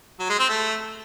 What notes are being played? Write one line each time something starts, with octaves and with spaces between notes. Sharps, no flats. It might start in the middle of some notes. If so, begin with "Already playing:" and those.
F#3
G#3
C4
A3